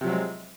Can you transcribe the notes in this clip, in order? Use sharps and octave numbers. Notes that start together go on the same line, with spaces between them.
C3 F3 F#3 G#3 C4